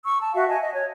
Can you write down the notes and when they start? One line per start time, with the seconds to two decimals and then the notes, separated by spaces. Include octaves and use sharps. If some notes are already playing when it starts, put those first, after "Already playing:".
0.04 C#6 E6
0.21 A5
0.34 F#4 E5 F5
0.48 D#5 G#5 A5
0.61 D#5
0.74 C#5